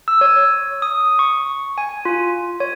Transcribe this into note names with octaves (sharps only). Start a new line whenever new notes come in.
E6
C#5
D#6
C#6
G#5
F4
C#5